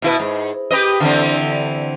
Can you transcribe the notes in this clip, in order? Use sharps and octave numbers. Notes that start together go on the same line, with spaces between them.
B2 E4 B4
G#2
G4 B4 D#5
D3 E3 C4